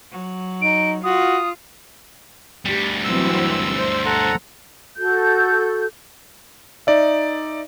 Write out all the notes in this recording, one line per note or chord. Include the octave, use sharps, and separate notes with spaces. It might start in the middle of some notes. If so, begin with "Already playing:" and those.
F#3
D#4 D7
F4 F#4 D#6
D2 G3 G4
E3 F#3 C4 E6
C5
A4 F#5 A#5
F#4 A4 G6
D#4 D5 E5